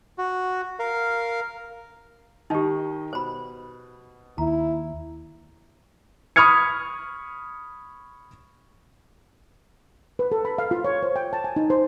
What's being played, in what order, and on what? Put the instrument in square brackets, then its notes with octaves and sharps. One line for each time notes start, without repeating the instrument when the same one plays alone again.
[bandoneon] F#4
A#4 F5
[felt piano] D#3 D#5 [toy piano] D#4 G4
[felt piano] B2 [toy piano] C5 B5
[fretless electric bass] D#2 [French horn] E4 [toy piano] A#5
[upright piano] B5 C#6 D#6 F6 G#6 C#7
[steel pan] B4
A4
B5
F5
F4
C#5
C5
G5
A5
G#5
D#4
C5